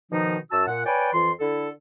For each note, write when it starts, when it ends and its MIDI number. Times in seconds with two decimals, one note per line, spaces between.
0.12 0.37 47
0.12 0.37 51
0.12 0.37 53
0.12 0.37 63
0.51 0.68 42
0.51 0.68 66
0.51 0.68 81
0.51 0.68 88
0.68 0.84 46
0.68 0.84 78
0.86 1.13 71
0.86 1.13 73
0.86 1.13 74
0.86 1.13 79
0.86 1.13 80
1.14 1.32 41
1.14 1.32 52
1.14 1.32 65
1.14 1.32 84
1.41 1.70 50
1.41 1.70 64
1.41 1.70 69